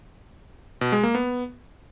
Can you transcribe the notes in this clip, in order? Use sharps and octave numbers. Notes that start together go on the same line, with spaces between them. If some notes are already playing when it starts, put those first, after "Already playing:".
B2
G#3
A#3
B3